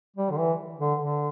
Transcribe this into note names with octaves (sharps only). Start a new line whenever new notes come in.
G3
D3
E3
D3
D3